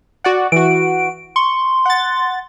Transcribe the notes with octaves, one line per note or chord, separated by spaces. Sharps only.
F#4 D5 F#5
E3 F#4 D7
C6 C#6
F#5 A6